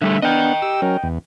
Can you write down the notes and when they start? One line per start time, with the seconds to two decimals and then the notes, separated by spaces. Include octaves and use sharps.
0.02 D3 G3 A3 E5
0.22 B3 D4 D#5 F#5 G5
0.62 G4 E6
0.82 F#3 C#4 A#4
1.03 E2